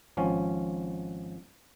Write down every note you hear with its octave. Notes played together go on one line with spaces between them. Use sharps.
G#1 F3 C#4